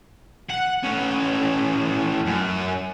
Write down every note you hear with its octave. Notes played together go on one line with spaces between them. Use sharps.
F#5
A2 C#4
F#2